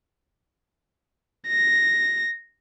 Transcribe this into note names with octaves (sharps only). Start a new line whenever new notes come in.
A#6